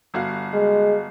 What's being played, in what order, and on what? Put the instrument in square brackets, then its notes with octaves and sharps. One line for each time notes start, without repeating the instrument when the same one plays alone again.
[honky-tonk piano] G1 F#4 F5
[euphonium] G#3